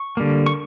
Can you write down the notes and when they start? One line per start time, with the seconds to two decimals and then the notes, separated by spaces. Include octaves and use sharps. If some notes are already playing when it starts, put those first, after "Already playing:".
Already playing: C#6
0.17 D3 G3 A#3
0.46 C#6